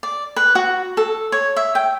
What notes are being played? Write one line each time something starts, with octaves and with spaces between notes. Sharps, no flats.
D5
B4
F#4
A4
C#5
E5
G5